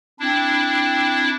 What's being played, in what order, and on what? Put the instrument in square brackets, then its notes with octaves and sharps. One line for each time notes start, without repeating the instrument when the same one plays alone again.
[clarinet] C4 [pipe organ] D4 E4